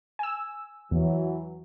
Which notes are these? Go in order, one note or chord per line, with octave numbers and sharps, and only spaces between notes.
G#5 E6
E2 E3 F#3